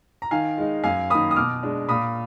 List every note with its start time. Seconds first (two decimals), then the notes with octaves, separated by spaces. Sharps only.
0.22 A#5
0.31 D#3 F5 G#5
0.57 G#3 D#4
0.84 F#2 F5 G#5
1.10 D#3 A#3 B5 D#6
1.31 D#6
1.36 B2 D6 F6
1.63 G#3 D4
1.89 A#2 B5 D#6